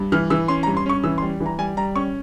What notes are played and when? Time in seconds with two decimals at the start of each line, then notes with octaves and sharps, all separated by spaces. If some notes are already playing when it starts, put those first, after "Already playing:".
Already playing: G2
0.12 E3 F6
0.30 E3 E6
0.48 C#4 C6
0.63 A#5
0.67 G2
0.77 C6
0.86 C#4 C#6
1.04 E3 E6
1.18 C6
1.22 G3
1.40 E3
1.46 A#5
1.59 G3 G#5
1.77 G3 A#5
1.96 C#4 C#6